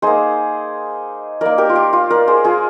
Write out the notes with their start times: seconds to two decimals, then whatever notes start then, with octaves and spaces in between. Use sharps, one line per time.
0.02 A#3 D#4 G#4 C5
1.41 A#3 D#4 A#4 D5
1.58 G4 A#4
1.69 F4
1.76 G4
1.93 F4
2.10 A#4 D5
2.28 G#4 C5
2.44 F4 G#4